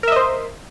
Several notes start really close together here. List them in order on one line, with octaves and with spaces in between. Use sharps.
A#4 E5 D#5 C5